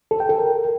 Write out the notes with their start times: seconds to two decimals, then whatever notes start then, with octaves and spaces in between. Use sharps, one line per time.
0.11 A4
0.20 G5
0.29 A4
0.38 A#4